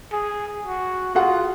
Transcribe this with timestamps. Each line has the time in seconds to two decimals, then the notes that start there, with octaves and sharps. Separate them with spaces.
0.12 G#4
0.66 F#4
1.15 F4 F#4 G#4 F#5